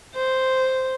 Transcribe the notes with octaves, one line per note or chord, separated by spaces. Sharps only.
C5